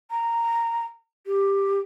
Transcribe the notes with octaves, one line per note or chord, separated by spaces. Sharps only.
A#5
G4